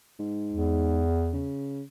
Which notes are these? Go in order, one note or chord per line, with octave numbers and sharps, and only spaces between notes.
G#2
E2
C#3